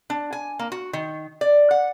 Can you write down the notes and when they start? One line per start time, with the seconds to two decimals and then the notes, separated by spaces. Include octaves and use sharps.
0.10 D4
0.33 G#5
0.59 A#3
0.72 F#4
0.93 D#3
1.41 D5
1.71 F#5